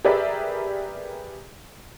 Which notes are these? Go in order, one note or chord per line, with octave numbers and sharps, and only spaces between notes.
G4 G#4 A#4 B4 D5 E5